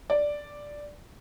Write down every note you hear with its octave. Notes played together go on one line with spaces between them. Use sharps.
D5